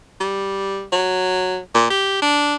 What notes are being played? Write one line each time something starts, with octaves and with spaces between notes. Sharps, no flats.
G3
F#3
A#2
G4
D4